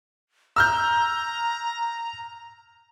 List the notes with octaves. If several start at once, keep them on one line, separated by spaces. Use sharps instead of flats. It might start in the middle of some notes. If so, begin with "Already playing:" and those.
A#5 E6 F6 G6